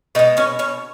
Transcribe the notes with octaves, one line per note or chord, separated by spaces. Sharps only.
B2 G#3 D#4 D#5
C#4 C#5
C#4 C#5